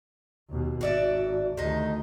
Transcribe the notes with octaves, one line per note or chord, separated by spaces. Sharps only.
D#2 B2
G#1 F#4 D5 E5
D2 C3 D#3 D#4